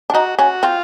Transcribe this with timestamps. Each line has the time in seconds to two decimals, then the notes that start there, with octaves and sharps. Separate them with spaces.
0.10 D4
0.14 D#4 F#4
0.39 C#4 F#4
0.63 C4 F4